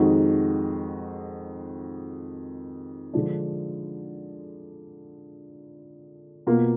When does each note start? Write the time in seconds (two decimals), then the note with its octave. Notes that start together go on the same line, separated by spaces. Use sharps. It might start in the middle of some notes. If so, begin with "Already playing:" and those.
Already playing: F2 D#3 G#3 D#4 F#4
3.14 D3 F3 G#3 D4
6.47 B2 A#3 F4